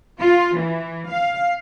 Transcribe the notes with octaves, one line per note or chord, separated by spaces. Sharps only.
F4
E3
F5